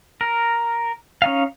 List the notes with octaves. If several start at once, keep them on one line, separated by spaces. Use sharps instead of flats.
A#4
C#4 D#4 F5